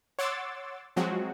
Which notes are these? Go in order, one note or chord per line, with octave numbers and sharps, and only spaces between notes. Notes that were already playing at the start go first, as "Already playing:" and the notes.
C#5 F#5 C6 D6 E6 A6
F3 F#3 G#3 C4 F#4